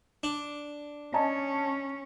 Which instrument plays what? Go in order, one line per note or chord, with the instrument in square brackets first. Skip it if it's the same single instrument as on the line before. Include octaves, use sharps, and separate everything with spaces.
[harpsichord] D4
[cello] C#4 [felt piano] D#5 G#5 A5